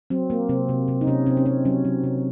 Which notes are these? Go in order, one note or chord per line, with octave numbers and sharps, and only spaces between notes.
F#3 C4
A#3
C3 C4
C3
C3
D#4
C3 C#4
C3 C4
C#4
C3 C4
F#3 C#4
F#3
C3